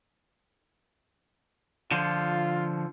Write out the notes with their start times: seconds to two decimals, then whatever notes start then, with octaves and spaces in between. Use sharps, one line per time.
1.91 D3 F3 F4